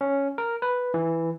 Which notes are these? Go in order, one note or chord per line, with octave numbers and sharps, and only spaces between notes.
C#4
A#4
B4
E3